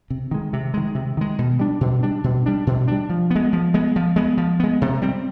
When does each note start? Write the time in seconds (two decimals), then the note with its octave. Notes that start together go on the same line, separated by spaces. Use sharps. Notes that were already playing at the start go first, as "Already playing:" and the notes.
0.10 C3
0.31 D#3 G#3
0.53 C3
0.74 D#3 G#3
0.95 C3
1.17 D#3 G#3
1.39 B2
1.59 G3 D4
1.81 B2
2.03 G3 D4
2.24 B2
2.46 G3 D4
2.67 B2
2.88 G3 D4
3.10 F3
3.31 B3
3.36 G#3
3.53 F3
3.74 G#3 B3
3.96 F3
4.16 G#3 B3
4.38 F3
4.60 G#3 B3
4.82 C3
5.02 G3 C4